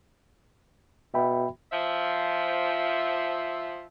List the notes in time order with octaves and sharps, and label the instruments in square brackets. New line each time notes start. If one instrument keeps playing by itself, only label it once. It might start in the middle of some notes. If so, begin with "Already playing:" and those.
[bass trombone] B2 [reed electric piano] E5 G5 B5
[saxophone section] F3 E5